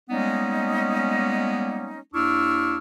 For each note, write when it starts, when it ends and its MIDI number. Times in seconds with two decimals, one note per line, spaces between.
0.09 1.99 55
0.09 1.99 56
0.09 1.99 58
0.09 1.99 59
0.09 1.99 61
0.09 1.99 63
2.13 2.77 39
2.13 2.77 62
2.13 2.77 64
2.13 2.77 85
2.13 2.77 88
2.13 2.77 89